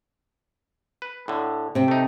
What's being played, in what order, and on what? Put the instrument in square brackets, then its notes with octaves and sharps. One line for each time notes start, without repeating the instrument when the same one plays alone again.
[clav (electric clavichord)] B4
A2 D3
[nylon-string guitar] C3 C4
[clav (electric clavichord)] A3 D#4